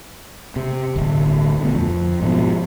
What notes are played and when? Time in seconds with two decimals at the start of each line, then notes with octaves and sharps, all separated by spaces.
0.56 C3
0.96 D1 G1
1.60 D2 B2
1.75 F2
2.22 G#2 B2 F3